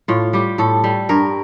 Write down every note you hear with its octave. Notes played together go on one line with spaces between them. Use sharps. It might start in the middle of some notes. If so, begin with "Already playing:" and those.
A2 F4
G3 G4
A2 A4
G3
G2 A#4